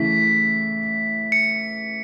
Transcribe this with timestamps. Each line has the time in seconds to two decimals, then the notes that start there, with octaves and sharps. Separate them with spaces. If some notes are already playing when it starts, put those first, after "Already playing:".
Already playing: C#3 E3 A3 E4 B6
1.32 C#7